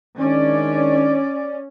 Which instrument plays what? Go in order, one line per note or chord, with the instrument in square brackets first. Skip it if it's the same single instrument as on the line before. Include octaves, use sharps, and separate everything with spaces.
[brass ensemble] D#3 G#3 D4 [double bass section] C#4 [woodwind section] D5